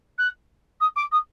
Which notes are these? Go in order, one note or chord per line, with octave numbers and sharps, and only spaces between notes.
F#6
D#6
D6
D#6